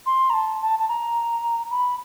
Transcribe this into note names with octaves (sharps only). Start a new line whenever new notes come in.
C6
A#5
A5
A5
A5
A#5
B5